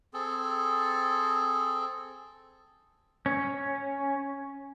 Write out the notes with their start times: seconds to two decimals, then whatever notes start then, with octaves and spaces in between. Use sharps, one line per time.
0.14 C4 G#4 A4
3.26 C#4